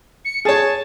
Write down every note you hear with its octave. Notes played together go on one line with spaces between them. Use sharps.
C#7
G#4 C#5 A5